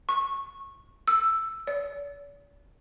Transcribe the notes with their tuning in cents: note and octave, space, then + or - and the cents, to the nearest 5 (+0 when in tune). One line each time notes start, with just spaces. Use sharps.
C#6 -20
E6 +5
D5 -45